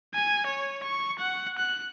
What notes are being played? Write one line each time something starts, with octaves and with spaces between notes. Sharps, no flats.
G#5
C#5
C#6
F#5
F#6